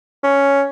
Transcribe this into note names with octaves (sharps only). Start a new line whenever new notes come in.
C#4